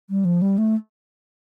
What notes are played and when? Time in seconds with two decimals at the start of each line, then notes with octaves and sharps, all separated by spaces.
0.10 G3
0.25 F3
0.42 G3
0.58 A3